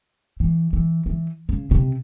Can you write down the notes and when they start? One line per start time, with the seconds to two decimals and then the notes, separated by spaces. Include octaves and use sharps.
0.40 E3
0.73 E3
1.06 E3
1.49 C#3
1.71 C3